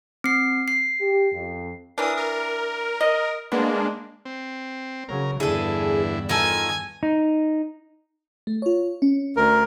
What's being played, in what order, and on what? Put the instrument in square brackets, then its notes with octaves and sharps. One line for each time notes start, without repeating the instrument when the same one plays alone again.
[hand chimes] C4 C7
C7
[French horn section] G4
F2
[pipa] E3 D4 [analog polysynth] A#4 D#6
[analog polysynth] A#4
[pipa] D#5
[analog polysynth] G#3 A#3 D4 [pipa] B3
[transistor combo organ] C4
[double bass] C#3 F#3 [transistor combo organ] A#4
[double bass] E2 G2 [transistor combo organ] D3 E4 [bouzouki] G#4 A4
[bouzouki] D#3 F4 A4 [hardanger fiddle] G#5 [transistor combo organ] D#6
[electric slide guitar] D#4
[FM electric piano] A3
F4 C#5
C#4
[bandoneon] D2 A#4